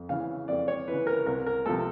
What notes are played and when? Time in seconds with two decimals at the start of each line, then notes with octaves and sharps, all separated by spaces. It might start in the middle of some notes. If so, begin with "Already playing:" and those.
Already playing: F2
0.09 C#3 E3 F5
0.48 F2 D5
0.68 C#5
0.88 C#3 E3 B4
1.07 A#4
1.26 C2 A#4
1.46 A#4
1.66 C3 F3 A3 A4